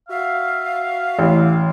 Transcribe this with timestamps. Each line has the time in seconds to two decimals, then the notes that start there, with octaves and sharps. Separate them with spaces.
0.09 F#4 E5 F5
1.19 A1